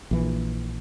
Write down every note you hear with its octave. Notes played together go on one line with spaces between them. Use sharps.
A#1 E3